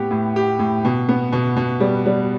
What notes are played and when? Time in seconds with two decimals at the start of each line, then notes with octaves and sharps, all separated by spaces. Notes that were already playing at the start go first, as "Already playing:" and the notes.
Already playing: A2 B3 G4
0.11 A2
0.36 G4
0.59 A2
0.85 B2
1.09 B3
1.32 B2
1.56 B2
1.80 G3
2.06 G3